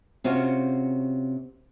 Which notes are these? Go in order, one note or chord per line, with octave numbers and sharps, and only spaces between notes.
C3 C4 C#4 F4 F#4